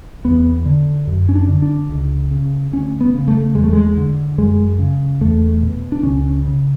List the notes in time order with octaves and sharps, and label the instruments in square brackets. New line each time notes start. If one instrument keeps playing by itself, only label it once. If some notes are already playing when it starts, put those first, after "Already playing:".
[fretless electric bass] E2 B3
D3
F#2
C#4
D4
D3
D4
C#2
C#3
D2 C#4
B3
C#3
A3
E2 G#3
A3
G#3
D3
F#2 G#3
C#3
E2 A3
B2
D4
C#2 C#4
C#3